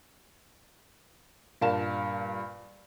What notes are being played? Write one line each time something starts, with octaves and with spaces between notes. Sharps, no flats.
G2 A#2 A#4 F5 A5 E7